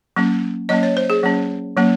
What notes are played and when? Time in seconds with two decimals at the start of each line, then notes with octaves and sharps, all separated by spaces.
0.16 F#3 A#3 C#4
0.69 F#3 A#3 C#4 D#5
0.83 C#5
0.97 C5
1.10 G#4
1.23 F#3 A#3 C#4
1.77 F#3 A#3 C#4